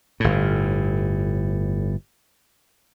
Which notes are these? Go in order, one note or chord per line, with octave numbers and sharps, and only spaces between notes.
G1 A2